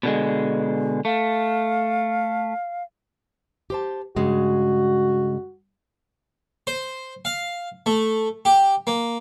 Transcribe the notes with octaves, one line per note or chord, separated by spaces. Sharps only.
B2 D3 G#3
A3 F5
G4 C5 A5
G2 C#3 G#3 F#4
C5
F5
A3
G4
A#3